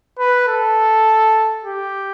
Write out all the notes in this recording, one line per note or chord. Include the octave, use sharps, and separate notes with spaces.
B4
A4
G4